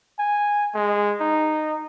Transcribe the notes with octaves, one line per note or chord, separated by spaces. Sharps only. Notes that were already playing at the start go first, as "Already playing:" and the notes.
G#5
G#3
D#4